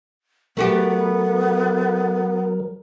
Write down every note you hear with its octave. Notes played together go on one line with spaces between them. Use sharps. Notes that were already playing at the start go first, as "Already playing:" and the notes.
F#3 A3 B3 F#4 G4 A#4